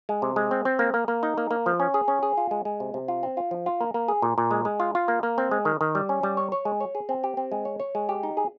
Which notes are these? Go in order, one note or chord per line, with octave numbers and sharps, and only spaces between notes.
G#3
C3
G#3
C4
C4
A#3
A#3
A#3
D#4
A#3
A#3
F3
C#4
G#4
C#4
G#4
F4
G#3
G#3
C3
C3
F4
C4
F4
F3
F4
A#3
A#3
G#4
A#2
A#2
G#3
G#3
F4
F4
A#3
A#3
C4
G#3
D#3
D#3
G3
C#4
G3
C#5
C#5
G#3
C#5
G#4
C4
G4
C4
G#3
C#5
C#5
G#3
G4
D#4
G#4